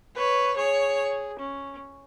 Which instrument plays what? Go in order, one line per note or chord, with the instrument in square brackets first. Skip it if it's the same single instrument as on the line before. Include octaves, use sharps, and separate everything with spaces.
[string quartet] B4 [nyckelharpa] C#5
[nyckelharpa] G#4 [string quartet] C#5
[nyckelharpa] C#4